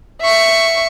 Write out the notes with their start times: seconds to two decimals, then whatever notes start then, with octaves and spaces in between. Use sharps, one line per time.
0.22 E5 C#6